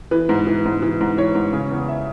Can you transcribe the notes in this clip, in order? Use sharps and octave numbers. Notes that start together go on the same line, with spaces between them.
E3 B4
G#2
E3
G#2
E3
G#2
E3 C#5
G#2
C#3
E2
E5